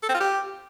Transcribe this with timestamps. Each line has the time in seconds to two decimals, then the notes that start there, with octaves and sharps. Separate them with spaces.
0.03 A4
0.09 C4
0.14 F4
0.20 G4